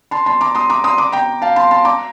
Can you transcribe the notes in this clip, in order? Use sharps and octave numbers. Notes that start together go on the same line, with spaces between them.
A5 C6
A5 C6
A#5 D6
C6 D#6
A#5 D6
C6 D#6
A#5 D6
G5 A#5
F5 A5
A5 C6
A5 C6
A#5 D6